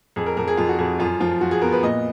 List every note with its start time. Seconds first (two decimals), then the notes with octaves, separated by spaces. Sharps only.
0.16 F2 G#4
0.26 A#4
0.37 F2 A#4
0.48 G#4
0.57 F2 F4
0.68 F#4
0.79 F2 G#4
0.99 F#2 F4
1.20 F3 F4
1.41 F3 F#4
1.51 G#4
1.62 B3 A#4
1.73 B4
1.83 A#2 D#5